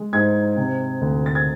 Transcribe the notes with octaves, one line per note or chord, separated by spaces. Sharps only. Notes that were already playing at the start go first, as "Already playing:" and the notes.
Already playing: G#3
G#2 G#6
C3
D2
A6
G#6